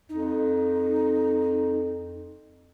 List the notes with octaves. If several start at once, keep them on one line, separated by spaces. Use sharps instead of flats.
F2 D#4